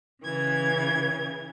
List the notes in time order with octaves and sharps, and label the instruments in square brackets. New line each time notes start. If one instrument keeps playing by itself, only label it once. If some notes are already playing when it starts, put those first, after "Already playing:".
[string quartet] C#3 E3 G#6